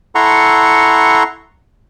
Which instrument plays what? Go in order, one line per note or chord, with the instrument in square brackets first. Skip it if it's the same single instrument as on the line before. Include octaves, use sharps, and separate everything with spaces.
[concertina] E4 A4 F#5 A#5 C6 C#6